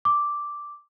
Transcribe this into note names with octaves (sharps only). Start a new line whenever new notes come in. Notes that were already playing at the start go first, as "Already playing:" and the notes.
D6